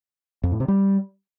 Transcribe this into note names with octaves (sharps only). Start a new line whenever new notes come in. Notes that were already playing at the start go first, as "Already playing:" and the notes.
F2
A2
C3
G3